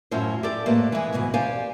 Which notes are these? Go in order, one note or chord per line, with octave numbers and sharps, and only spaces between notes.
F#2 A2 F3 C#4 E4 C5
G4 A4 D5
F2 A2 A3 A#3 B4 C5
E3 G#3
D2 G#2 B2 E3
G4 C5 D5 F5 G#5